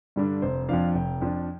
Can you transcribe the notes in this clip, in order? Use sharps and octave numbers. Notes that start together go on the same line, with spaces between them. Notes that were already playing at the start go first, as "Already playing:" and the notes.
G2 D3 G3 D4
F1 C5
F2 F3 D4 F5
F1 G5
F2 F3 D4